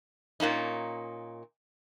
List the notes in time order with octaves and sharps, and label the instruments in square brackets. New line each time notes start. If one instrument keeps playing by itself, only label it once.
[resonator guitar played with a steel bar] A#2 A#3 C#4 D#4